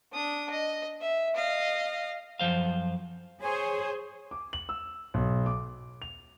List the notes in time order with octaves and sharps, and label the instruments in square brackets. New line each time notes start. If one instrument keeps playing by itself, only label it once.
[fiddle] D4 D#6
D#5
E5
D#5 F5
[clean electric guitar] F#2 F3 C5 F5
[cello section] G#4 C5 [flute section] C#5 G#5
[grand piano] D6
F#7
E6
B1
D6
F7